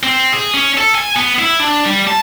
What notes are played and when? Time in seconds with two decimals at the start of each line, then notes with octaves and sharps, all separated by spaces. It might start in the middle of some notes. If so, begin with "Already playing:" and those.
0.03 C4
0.33 G#4
0.54 C#4
0.77 A4
0.95 G#5
1.16 B3
1.39 E4
1.60 D4
1.86 G3
2.08 A5